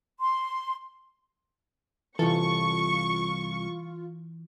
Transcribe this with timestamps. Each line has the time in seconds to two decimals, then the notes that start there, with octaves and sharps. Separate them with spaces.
0.19 C6
2.19 C2 E3 F4 A4 C#6